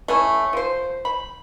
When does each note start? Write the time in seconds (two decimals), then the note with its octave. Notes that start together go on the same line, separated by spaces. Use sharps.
0.08 A3 C#4 E4
0.53 F3 C5
1.05 B5